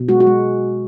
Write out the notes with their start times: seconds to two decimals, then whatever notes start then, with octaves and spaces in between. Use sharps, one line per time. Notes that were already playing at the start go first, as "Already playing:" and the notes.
Already playing: B2
0.09 G#3 F#4
0.20 F#4
0.27 G#3